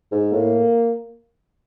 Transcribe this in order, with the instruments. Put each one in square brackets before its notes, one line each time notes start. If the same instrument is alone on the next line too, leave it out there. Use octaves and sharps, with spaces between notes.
[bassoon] G#2
[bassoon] A2 [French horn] A#3